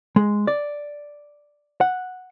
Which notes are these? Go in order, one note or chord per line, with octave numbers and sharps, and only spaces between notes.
G#3
D5
F#5